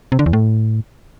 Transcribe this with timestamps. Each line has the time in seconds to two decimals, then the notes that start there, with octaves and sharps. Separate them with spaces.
0.12 C3
0.19 D3
0.26 E2
0.33 A2